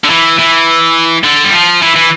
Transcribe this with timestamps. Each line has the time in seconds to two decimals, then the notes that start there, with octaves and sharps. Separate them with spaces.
0.04 D3
0.10 E3
0.39 E3
1.24 D3
1.44 G3
1.53 F3
1.82 E3
1.96 E3